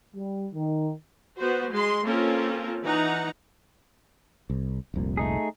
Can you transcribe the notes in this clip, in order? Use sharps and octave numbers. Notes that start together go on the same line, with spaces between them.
G3
D#3
B3 F#4 C5
G#3 C6
A#3 C4 C#4 F4 A4 A#4
E3 D#4 F#5 A#5
C2
F1 C2 A#2
A3 D#4 G#4